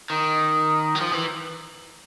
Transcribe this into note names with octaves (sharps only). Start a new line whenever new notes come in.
D#3
F#3
F3
E3